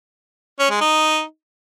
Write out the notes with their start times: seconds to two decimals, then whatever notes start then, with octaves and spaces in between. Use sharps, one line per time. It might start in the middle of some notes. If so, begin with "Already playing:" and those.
0.59 C#4
0.70 G#3
0.81 D#4